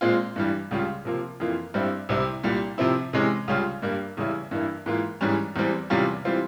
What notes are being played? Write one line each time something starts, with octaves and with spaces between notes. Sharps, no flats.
A#2 G#3 C4 F4
G2 E3 G3
C#2 C#3 G3 C#4 F4
C3 F3 A#3 F4
F2 E3 A#3 F4
G2 G3 C4 E4
C2 C3 G3 C4 E4
C2 A#2 G3
C3 F3 C4 E4
C3 E3 G#3 C#4
C#2 C#3 G3 C#4 F4
G2 G3 A#3
E2 C#3 G3 C#4 E4
G2 E3 A#3 E4
G#2 E3 A#3 F4
G#2 E3 G3 C#4
E2 E3 G3 C4
E2 C3 G3 C#4 F4
E3 G3 C4 F4